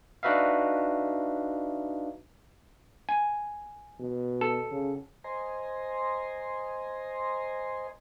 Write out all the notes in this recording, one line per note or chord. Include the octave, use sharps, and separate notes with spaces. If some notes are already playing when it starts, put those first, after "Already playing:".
D4 D#4 F#4 B4 E5 F5
G#5
B2
A4
C#3
C5 D#5 G#5 A#5 C6